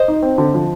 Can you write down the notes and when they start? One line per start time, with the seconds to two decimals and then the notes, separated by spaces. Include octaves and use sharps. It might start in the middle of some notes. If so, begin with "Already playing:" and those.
Already playing: C5 D#5
0.08 D#4
0.22 C4
0.38 D3
0.54 F3